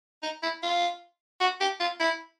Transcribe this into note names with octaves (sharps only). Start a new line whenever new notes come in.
D#4
E4
F4
F#4
G4
F4
E4